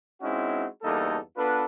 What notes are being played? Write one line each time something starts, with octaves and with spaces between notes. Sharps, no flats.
G#3 C4 C#4 D#4 E4 F#4
E2 G2 A#3 D#4 A4
B3 D4 F4 A4 B4